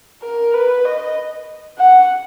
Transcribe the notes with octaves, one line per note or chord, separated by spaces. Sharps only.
A#4
B4
D#5
F#5